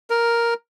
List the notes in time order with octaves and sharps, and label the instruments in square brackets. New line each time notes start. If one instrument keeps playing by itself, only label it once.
[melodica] A#4